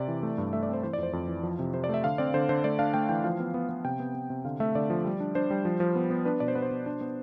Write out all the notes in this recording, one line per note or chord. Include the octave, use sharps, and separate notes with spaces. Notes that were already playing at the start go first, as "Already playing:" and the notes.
Already playing: C3 D5
E3
A3
G2
A3 E5
D5
C4 C5
E3 C5
D5
F2 C5
F2 C5
E3
F3
C3
C3 C5
D5
A3 E5
D3 F5
C4 D5
D3 C5
D3 C5
A3 D5
D4 F5
A3 G5
E3 G5
F3 F5
B3
B3
B3
C3 G5
B3
B3
C3
D3 F5
A3 E5
D3 D5
F3
G3
D4
D4 C5
G3
F3
F3
B3
B3
D4 B4
B2 D5
C5
B3 B4
C5
B2
D4
B3